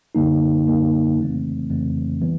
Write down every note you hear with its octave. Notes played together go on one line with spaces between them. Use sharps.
F#2 D3 G3 A#3 D#4
F#2 D3 G3 A#3 D#4
F2 C#3 E3 A3 C4
F2 C#3 E3 A3 C4
C3 E3 G3 B3